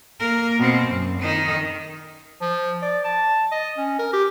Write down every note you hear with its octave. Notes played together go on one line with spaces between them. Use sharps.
A#3 A#4
B2 C4
F#2
D#3 D#4
F3
D5
A5
D#5
C#4
A#4
G4